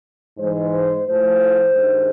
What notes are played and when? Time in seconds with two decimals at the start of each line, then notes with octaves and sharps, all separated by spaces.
0.37 G#2 E3 G#3 C5
1.05 A2 F3 A3 C5
1.72 G2 D#3 G#3